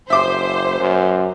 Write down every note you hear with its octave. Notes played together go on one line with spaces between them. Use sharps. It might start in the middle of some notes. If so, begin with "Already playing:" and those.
F#1 C5 E5 D6
F#2